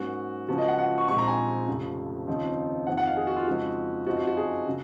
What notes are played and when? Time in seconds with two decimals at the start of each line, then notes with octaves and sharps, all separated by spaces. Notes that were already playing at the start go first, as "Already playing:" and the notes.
Already playing: G#2 F#3 A#3 C#4 F#4
0.48 C#2 C#3 F3 A#3 C#4 F#4
0.58 D#5
0.68 F#5
0.78 F#5
0.98 C#6
1.08 A#1 A#2 G#3 C4 D#4 C#6
1.18 A#5
1.28 G#5
1.67 F1 F2 C#3
2.27 D#2 C#3 F3 C4 D#4
2.87 F2 D#3 A#3 D#4 F#5
2.97 F#5
3.07 F5
3.17 G#4
3.27 F#4
3.36 F4
3.47 F2 C#3 G#3 D#4 F#4
4.07 F#2 F3 C4 D#4 F#4
4.17 F#4
4.27 F#4
4.37 G#4
4.67 C#3 F#3